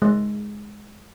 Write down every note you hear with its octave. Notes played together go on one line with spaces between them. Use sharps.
G#3